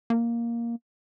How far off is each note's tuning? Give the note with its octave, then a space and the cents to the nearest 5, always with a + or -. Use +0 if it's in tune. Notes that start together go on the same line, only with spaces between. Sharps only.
A#3 +5